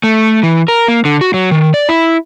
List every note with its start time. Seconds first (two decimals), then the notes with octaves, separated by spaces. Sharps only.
0.04 A3
0.43 E3
0.68 A#4
0.88 A#3
1.05 D3
1.21 F#4
1.34 F#3
1.51 D#3
1.74 D5
1.89 E4